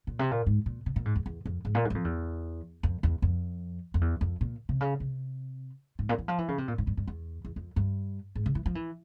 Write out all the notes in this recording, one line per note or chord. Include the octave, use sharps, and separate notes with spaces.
A#2
C3
A#2
G#2
A#2
C3
A#2
G#2
E2
E2
F2
G#2
A#2
G#2
G2
F2
E2
F2
E2
F2
F2
E2
F2
A#2
C3
C#3
C3
G#2
A#2
E3
F3
E3
C#3
C3
A#2
G#2
G2
G2
E2
E2
F2
G2
G#2
C#3
E3
F3
E3